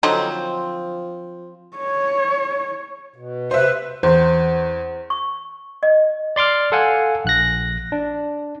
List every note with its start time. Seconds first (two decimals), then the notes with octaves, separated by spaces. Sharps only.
0.03 D3 F3 F#3 C4 D#4
1.77 C#5
3.16 B2
3.51 C3 B4 C5 E5
4.03 E2 C5
5.10 C#6
5.83 D#5
6.36 D5 C6 D6 F6
6.72 A4 F5 F#5 G#5
7.25 A#1 F#6 A#6
7.92 D4